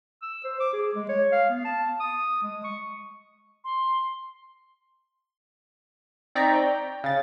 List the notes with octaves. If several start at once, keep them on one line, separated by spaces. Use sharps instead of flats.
E6
C5
D6
G#4
G#3
C#5
F5
B3
A5
D#6
G#3
C#6
C6
C4 D#4 D5 A#5 C#6 B6
G5
C#3 A6